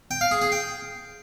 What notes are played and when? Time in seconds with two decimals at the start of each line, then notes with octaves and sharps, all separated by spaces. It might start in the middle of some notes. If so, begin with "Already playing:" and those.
0.11 G5
0.21 F5
0.31 G#4
0.42 G#4
0.52 G5